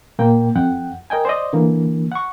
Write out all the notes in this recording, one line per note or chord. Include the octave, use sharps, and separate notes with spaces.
A#2 A#3 G5
F2 F#5 G5
A#4 D#5 G5 G#5
C5 D5 D#5
D3 E3 A#3
F#5 C#6